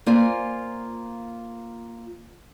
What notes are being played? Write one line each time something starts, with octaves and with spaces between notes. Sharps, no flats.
A#3 F4 C5 D5 G#5